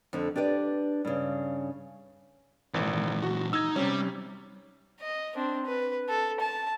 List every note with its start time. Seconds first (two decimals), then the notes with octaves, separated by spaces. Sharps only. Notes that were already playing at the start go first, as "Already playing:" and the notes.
0.13 F2 D3
0.36 D4 G4 B4 D5
1.05 G2 C#3
2.74 G#1 A#2 E3
3.23 F#4
3.53 D#4 E6 G#6
3.76 C3 G3 C#4
5.00 D#5
5.36 C4 D4
5.66 B4
6.09 A4
6.40 A5